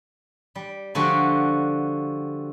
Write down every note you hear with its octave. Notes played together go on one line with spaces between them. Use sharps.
G3
D3 F3 G3 F#4